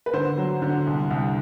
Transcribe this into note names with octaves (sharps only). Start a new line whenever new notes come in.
B4
D3 C5
F#3
D3
C2
C2